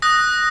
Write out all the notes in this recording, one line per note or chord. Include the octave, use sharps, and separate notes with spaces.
D#6 F#6 A#6